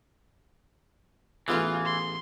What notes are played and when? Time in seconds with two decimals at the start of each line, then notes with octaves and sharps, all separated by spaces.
1.48 A1 E3 B3 F4 G#4
1.85 C6